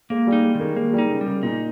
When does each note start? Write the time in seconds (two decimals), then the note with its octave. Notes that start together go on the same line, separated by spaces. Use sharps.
0.10 G#3 A#3
0.27 G3
0.32 D#4
0.44 G#3
0.55 D#3
0.60 A#3
0.76 G#3 A#3
0.93 G3
0.98 D#4
1.10 C#3
1.21 C#3 G3
1.43 A#2 D#4